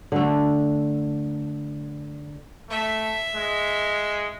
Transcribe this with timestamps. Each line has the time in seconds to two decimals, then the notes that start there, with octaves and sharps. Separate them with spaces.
0.12 D3 A3
2.70 A3 E5
3.35 G#3